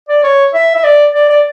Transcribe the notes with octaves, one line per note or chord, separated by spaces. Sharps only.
D5
C#5
E5
E5
D5
D5
D5